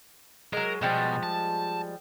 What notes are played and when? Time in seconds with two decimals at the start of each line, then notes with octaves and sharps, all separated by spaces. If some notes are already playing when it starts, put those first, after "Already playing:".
0.53 F#3 G#3 A#4
0.81 B2 F3 G3 G#3
1.23 A5